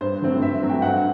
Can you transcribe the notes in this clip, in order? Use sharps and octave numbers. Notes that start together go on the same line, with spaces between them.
G2 C5
D3 F#3 A3 C4
G2 E5
F#3 A3 C4
G5
G2 F#5